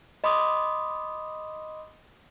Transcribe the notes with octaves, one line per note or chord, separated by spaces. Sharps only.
D#5 B5 C6 D6 D#6